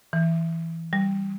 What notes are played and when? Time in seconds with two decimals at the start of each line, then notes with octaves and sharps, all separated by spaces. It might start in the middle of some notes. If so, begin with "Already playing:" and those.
0.13 E3
0.93 G3